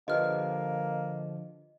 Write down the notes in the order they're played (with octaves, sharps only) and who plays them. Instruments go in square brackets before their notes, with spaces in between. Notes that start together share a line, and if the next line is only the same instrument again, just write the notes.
[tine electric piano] D3 F3 [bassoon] A#3 [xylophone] G4 B4 F6 [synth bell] D#5